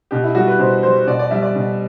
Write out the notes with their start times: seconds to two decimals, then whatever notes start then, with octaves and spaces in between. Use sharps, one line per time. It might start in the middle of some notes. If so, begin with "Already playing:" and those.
0.11 B2 G4
0.24 E4
0.35 G3 F#4
0.48 B4
0.59 B2 C5
0.83 G3 C5
1.07 B2 D5
1.19 D5
1.31 G3 E5
1.43 D5
1.55 B2